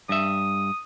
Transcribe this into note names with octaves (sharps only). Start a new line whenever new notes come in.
G2 E5 D#6